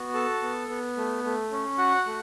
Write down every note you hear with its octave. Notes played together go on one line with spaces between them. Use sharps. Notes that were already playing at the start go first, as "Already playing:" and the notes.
Already playing: B3 F#4
A4 A5
B3
B3
A3
A3
C#4
F#4 F#5
A3